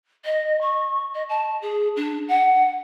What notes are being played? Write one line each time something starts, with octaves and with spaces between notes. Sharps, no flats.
D#5
C#6
D#5
A5
G#4
D4
F#5